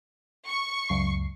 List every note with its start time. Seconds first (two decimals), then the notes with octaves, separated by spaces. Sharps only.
0.47 C#6
0.89 C#2 F#2 C7